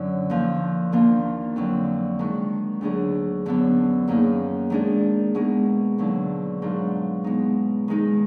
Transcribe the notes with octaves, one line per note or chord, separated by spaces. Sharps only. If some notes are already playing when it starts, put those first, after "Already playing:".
Already playing: F#2 D3 F#3
D#2 D3 F3
D#2 D#3 A#3 D4 F4
F2 D3 F#3
D#3 G#3 D4 F#4
D2 D3 F#3 D4 G#4
F#2 D3 F#3 B3 D4
F#2 D#3 A#3 D#4 G#4
D#3 G#3 D4 G#4
B2 G#3 D#4 G#4
D#2 D3 F#3 D4
G#2 F#3 D4 F4
B2 G#3 D#4
D#3 G#3 D#4